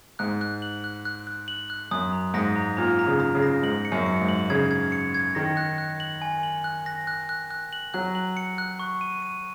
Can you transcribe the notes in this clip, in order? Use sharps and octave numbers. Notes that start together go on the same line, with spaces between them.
G#2 F#6
F#6
F#7
F#6
F#6
F#6
F#7
F#6
F#2 D#6
A#5
G#2 A#6
A#5
A#2 A#5
A#5
C#3
A#5
C#3
A#6
G#2 F#7
C#7
F#2
C#7
G#2
F#7
C#3 G#6
G#6
C#7
G#6
D#3 A#6
F#6
F#6
F#7
G#5
F#7
F#6
A#6
F#6
F#6
F#6
F#7
F#3 F#6
F#7
C#7
F#6
C#6
D#7
D#7